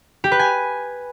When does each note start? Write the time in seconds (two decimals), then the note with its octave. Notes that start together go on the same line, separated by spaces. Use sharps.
0.24 G4
0.32 B4
0.39 G#5